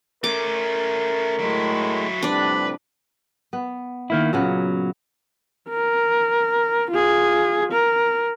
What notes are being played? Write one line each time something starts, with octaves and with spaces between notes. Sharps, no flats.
A3 C#4 A#4 D6
A2 F#3 G#3 A3 E4
A2 C3 F3 G3 D4 B4 D5
B3
D#3 A#3 E4
A#2 C#3 F#3 B3
A#4
F4 G#4
A#4